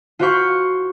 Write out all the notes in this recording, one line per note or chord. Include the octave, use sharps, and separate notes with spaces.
F4 F#4 C5 F5 B5 C#6